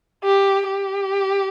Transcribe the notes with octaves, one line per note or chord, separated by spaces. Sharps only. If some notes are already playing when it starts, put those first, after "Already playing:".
G4
G4